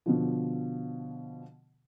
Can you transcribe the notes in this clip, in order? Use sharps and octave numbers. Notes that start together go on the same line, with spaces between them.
B2 D3 F3